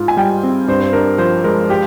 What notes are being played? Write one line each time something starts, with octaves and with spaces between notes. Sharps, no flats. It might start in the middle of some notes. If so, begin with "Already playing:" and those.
Already playing: G#2 F4
G#5
G3 G5
C4
G2 C5
C5
D4 A#4
F3 C5
G#3 A#4
G4